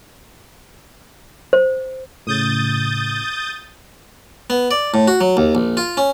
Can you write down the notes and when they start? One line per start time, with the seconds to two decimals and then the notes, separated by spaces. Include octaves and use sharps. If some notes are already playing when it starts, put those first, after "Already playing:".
1.53 C5
2.27 A2 C#3 D#6 G6 A6
4.50 B3
4.71 D5
4.94 A2
5.08 F#4
5.21 F#3
5.37 D#2
5.55 A#1
5.77 F4
5.97 C#4